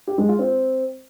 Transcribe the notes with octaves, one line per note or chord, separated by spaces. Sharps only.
G4
G#3
F4
C4